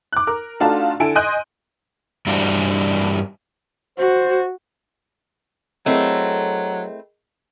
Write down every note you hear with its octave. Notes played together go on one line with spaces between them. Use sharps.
D6 F#6
A#4
A3 D4 D#4 F4 F#4 A5
D3 E4 A4 G#5 D7
D#5 G#5 C6 F#6 G6 D#7
G2 E3 G3 D4 F#4
F#4 C5
F#3 A3 C4 E4 G#4 A#4 D#5